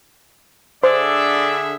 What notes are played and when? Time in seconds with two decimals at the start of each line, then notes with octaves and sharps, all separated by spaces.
0.84 D3 G#4 C5 D5 E5